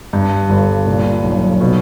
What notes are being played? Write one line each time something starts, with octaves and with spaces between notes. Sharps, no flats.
G2
G1
A#2
B1
B2